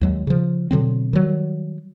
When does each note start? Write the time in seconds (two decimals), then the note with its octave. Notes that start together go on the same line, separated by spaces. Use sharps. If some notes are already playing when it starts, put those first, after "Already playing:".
0.01 D#2 F#3 G#3
0.27 C#3 F3
0.71 B2 D3 F#3 C4
1.13 D#3 F#3 G3